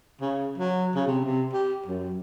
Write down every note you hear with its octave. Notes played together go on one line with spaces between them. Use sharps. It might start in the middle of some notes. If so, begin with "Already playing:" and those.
C#3
F#3
C#3
C3
C3
G4
F#2